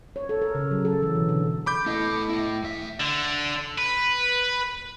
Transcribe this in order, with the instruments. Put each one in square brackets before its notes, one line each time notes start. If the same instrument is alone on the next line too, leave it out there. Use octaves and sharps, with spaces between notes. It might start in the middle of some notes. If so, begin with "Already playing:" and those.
[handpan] C#5
A4
A#4
C#3
F#3
A4
E3
B2
D3
[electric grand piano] B5 D6 G6
[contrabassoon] A2 [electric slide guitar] B3 D#5
[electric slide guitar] A3 E4
E2 E5
[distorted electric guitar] D3
B4